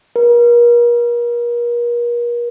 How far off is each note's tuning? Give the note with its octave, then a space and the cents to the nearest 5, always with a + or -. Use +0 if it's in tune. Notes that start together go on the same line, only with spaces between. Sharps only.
A#4 +40